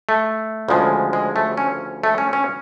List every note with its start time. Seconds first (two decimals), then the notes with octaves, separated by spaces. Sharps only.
0.09 A3
0.68 D2 C#3 F3 G#3
1.13 G#3
1.36 A3
1.57 C#4
2.04 A3
2.18 C#4
2.33 C#4